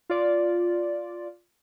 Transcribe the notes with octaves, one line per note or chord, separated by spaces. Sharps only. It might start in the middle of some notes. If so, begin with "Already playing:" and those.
F4 D5